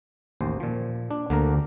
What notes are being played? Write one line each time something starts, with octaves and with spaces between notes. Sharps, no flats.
A1 D#2 C5
A#2 F3
D4
D2 D3 A#3 A#4